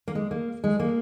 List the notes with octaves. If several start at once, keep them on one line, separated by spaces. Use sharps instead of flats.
A#3
G#3
A#3
G#3
A#3